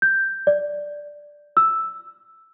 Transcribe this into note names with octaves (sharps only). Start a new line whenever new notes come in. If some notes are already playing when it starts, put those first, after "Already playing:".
G6
D5
E6